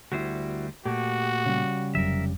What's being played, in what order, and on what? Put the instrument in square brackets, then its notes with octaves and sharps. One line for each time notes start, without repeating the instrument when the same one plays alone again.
[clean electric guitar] D2 G3 C5 [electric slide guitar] E4 F#4
[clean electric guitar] A#2 A3 [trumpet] F#4 [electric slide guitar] G4
[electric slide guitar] C#3 G3
[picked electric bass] F1 D#2 F#3 [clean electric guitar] A#4 E5